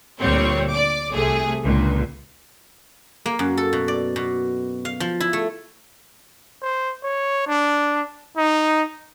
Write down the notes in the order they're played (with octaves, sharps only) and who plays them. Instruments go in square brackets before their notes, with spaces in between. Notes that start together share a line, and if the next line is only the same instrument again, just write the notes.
[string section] D2 A#2 G3 C4 C#5
D5 D6
C2 C3 A3 G#4
C#2 A#2 D3
[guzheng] A#3
F#2
A4
B2
D5
B2
F5
F3
E4
A3
[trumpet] C5
C#5
D4
D#4